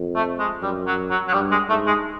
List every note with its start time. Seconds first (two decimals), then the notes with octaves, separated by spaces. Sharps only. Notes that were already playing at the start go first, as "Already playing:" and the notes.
Already playing: F2
0.15 A3
0.39 G#3
0.62 F#2 G3
0.87 F#3
1.10 F#3
1.28 F#3
1.33 G2 G3
1.51 G#3
1.69 G#2 A3
1.87 G#3